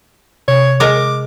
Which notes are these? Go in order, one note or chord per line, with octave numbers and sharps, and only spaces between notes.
C3 C#5
G#3 A#4 D6